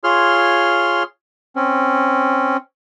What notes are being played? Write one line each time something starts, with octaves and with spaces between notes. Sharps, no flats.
F4 G#4 C#5 C6 F6
C4 C#4